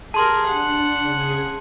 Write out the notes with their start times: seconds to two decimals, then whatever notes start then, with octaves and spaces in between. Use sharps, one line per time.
0.14 G4 G#4 A#4 A5 C6
0.48 D4 F#5
1.01 C#3 G#4